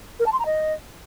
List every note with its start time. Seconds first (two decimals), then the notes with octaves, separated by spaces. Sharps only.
0.19 A#4
0.26 A5
0.33 C6
0.39 A#5
0.46 D#5